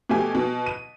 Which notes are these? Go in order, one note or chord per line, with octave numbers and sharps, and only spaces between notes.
B2 A3 G4 G#5
B2
D#7